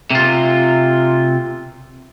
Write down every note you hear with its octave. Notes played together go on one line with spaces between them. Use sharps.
C3 F4